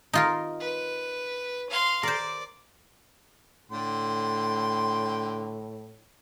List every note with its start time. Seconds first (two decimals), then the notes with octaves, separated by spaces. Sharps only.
0.13 D#4 F4 A#4
0.60 B4
1.70 F5 C6
2.03 A#4 C5 D5
3.71 A2 D3 G5 C6